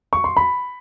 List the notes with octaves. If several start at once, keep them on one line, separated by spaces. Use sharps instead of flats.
C#6
C6
B5